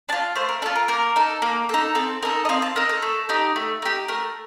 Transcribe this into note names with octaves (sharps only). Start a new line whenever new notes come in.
D4 A5
F4
A3 C5
A#4
D4 A4
F4
A#4
A#3 A#4
D#4 A4
A#3
D#4 A4
C4 A4
D#4 A4 A#4
D#5
C4 F5
A5
D#4 A4 A#4
A4
A3
D#4 G4
A3
D#4 G4
A3 A#4